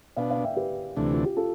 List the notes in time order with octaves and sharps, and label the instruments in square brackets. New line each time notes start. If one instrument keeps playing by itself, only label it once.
[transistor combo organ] B2 B3 D4 [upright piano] D5 F5
[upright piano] D5 F5
E5 G5
G4 B4
[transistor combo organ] D2 C3 E3 A3 D4
[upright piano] F4
G4
F4 A4